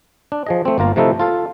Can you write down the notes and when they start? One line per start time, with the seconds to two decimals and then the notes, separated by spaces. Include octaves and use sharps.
0.32 D4
0.46 F3 G#4 D#5
0.65 A3 C4
0.78 G1 A#3 F4 A#4
0.96 C3 F3 A3 D#4 E4 A4
1.19 F4 A4 F5